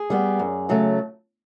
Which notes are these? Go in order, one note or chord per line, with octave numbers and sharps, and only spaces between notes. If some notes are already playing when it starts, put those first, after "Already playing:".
Already playing: G#4
G3 B3
F#2
C#3 F#3 A3